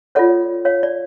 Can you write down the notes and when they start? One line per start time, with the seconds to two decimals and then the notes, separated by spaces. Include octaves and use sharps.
0.15 F4 A4 C#5 D5 F#5
0.65 C#5 F5
0.83 D5